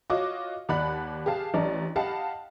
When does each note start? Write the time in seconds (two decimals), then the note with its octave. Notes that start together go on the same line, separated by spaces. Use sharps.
0.10 F4 F#4 C#5 D#5 D6
0.69 D#2 D5 F#5 B5 F#6
1.26 G4 G#4 F5 A5
1.54 A1 D4 D5 A#5
1.96 G4 D#5 F5 F#5 A5 B5